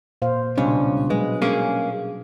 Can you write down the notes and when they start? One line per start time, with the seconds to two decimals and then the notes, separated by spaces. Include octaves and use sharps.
0.22 A#2 C5 F5
0.58 C#2 B2 G3 C#4 D4
1.10 F#3 G#3 B4
1.42 A#3 C#4 G#4